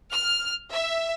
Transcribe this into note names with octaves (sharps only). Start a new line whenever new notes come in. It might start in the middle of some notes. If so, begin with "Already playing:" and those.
F6
E5